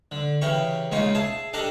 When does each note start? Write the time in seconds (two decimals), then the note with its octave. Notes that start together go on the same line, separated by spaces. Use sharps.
0.11 D3
0.41 C#3 E3 G4 A#4 C#6
0.91 C#2 C#3 A#3 D#4 F4 C#6
1.15 G#4 E5 A5
1.53 D4 G4 A4 A#4 D5 D#5